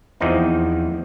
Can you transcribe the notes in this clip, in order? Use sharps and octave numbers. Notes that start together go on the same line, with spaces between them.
E2 E3 F3 C4 D#4